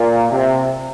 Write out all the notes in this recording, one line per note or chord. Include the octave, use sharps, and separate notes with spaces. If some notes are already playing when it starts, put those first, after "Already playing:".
Already playing: A#2
C3